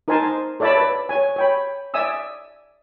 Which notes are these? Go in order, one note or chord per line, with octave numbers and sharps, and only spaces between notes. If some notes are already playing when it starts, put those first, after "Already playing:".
D#4 A#4 C5 G#5 A5 C6
A4 C#5 D5 E5 A5 B5
B4
C#5 G#5
C#5 G5 B5
D5 E5 G#5 D#6 E6